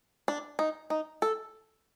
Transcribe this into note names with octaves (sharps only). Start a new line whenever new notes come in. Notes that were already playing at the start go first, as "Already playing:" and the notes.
D4
D#4
D#4
A4